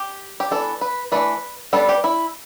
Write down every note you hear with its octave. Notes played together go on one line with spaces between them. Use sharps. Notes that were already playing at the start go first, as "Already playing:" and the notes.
Already playing: G4
G4
E3 B3 D4 A4
B4
E3 A3 D4 B4
G3 B3 D4 A4
G4
E4